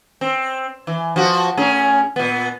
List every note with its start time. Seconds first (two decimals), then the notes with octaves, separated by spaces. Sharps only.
0.21 C4
0.87 E3
1.16 F3 F#4
1.57 A2 C#4 G#4
2.16 A#2 B3